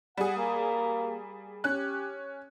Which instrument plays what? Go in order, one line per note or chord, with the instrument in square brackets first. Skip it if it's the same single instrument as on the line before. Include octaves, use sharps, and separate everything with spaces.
[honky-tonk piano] G3 G#4 [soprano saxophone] F#5
[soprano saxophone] A#3
[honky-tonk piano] C#4 F#6 [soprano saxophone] G4